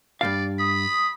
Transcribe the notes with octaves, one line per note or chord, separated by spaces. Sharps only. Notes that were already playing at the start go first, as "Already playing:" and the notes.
G2 C3 D5 F5
B5 D#6